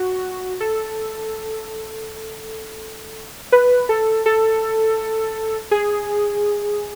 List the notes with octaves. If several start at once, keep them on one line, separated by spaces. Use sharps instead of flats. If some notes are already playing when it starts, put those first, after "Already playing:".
Already playing: F#4
A4
B4
A4
A4
G#4